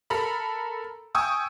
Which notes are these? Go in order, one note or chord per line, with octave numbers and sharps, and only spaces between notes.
A4 A#4 A#5 B5
G5 G#5 C#6 D#6 E6